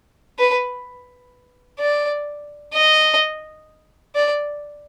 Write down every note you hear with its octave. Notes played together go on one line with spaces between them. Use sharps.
B4
D5
D#5
D5